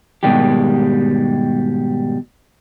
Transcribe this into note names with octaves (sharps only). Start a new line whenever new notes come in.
G#2 B2 D#3 G3 G#3 G4